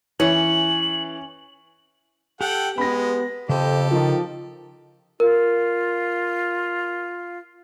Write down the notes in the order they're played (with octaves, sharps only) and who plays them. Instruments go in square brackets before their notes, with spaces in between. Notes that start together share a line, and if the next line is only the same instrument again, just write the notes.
[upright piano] E3 [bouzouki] C#4 [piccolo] F#7
[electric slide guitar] G4 [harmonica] A4 F#5 G5
[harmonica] G#3 [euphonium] B3 [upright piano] B5 A#6
[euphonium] F2 [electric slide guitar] C#3 C5 D#5 [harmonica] G4 A4
[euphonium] D#3 [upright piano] F3
[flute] F4 [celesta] A#4